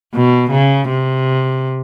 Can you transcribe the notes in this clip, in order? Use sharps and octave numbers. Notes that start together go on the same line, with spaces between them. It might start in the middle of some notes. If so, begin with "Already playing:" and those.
B2
C#3
C3